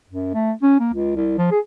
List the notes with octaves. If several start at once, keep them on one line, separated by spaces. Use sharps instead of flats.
F#2
A3
C#4
A#3
C#2
C2
F3
G#4